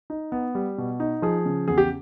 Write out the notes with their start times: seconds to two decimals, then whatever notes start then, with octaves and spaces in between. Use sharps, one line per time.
0.10 D#4
0.32 B3
0.55 G3
0.78 B2
1.00 D#4
1.22 F3 G#4
1.46 C#3
1.68 E2 G#4
1.78 G4